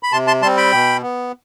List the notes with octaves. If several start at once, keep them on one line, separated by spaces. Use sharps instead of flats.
B5
C3 A5 C6
A5 C6
G3 C4 A5 C6
G5 B5
B2
B3